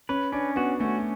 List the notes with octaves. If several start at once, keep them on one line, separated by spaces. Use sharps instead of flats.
C#4 B4
C#4 D4
B3 F#4
A3 C#4